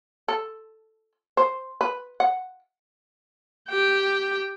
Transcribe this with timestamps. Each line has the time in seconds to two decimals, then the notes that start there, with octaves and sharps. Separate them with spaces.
0.28 A4
1.37 C5
1.81 B4
2.20 F#5
3.69 G4 G5